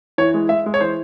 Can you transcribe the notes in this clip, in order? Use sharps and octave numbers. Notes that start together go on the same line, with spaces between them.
E3 C#5
G#3
G#3 E5
G#3
C#5
E3 C5